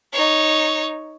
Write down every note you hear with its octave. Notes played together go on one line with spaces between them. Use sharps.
D#4 C#5